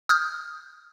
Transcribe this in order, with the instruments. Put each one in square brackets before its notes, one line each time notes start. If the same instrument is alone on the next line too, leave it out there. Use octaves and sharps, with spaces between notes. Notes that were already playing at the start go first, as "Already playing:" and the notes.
[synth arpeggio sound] D#6 F6 G6